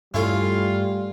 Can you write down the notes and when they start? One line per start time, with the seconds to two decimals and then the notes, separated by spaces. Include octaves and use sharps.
0.14 G2 G3 A3 C#4 E4 F4 A4